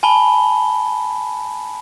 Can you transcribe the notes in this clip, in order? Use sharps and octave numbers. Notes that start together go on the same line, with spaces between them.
G#5 A5 B5 G7